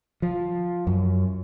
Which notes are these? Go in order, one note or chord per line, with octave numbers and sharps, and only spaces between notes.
F3
F#2